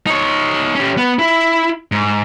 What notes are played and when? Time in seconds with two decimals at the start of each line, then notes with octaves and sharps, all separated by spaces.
0.07 D#4 C#5
0.75 C#4 G4
0.97 B3
1.19 E4
1.92 G#2